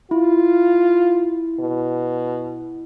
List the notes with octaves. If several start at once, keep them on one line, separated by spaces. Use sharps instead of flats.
E4 F4
B2